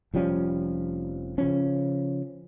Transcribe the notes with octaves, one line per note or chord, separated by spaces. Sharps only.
F1 F3 G3 C#4
C#3 F3 C#4